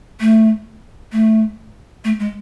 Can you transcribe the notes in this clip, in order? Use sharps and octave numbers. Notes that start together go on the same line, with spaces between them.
A3
A3
A3
G#3